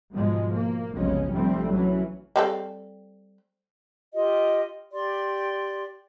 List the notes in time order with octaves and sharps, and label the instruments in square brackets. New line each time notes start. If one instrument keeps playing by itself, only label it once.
[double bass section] G#2 B2 F3 G#3
A#3
F1 B1 C#3 F3 G#3 C#4
A#1 C3 F3 G3 A3 C4
E3 F#3 C#4
[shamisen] G3 C4 A4
[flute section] F4 G4 D#5
G4 D5 C6